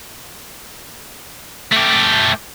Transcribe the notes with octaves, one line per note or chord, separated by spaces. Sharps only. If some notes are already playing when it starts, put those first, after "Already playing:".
A3 G4